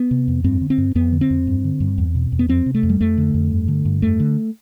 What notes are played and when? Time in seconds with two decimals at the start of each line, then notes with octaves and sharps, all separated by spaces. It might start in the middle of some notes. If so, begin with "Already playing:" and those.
Already playing: B3
0.11 C3
0.28 F2
0.44 G2 C4
0.61 D3
0.70 C4
0.78 G2
0.95 F2 B3
1.12 D3
1.21 C4
1.30 F2
1.47 G2
1.64 D3
1.80 G2
1.98 E2
2.15 B2
2.32 E2
2.39 B3
2.48 F2 C4
2.66 C3
2.75 A3
2.83 F2
2.89 G3
3.01 F2 A3
3.17 D3
3.34 F2
3.51 G2
3.68 D3
3.85 G2
4.02 F2 A3
4.20 D3